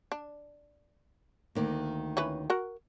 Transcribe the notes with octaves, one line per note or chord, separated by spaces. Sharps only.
D4
D2 D#3 A#3
E3 C#4 B4
F#4 A#4 F#5